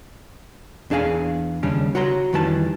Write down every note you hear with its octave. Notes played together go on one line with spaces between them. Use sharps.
E2 D4 G#4 F5 G#5
D#2 C#3 G3 C#4 D4
F#4 C#5 F#5 A#5 C6
F2 D#3 E3 G3 G#4 A5